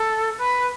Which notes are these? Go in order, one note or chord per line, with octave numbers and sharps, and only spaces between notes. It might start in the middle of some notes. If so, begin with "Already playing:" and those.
Already playing: A4
B4